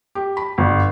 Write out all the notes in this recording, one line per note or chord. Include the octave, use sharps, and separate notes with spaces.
G4
B5
G1